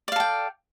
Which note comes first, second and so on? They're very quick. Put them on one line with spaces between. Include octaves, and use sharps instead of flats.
D5 F5 A4 G5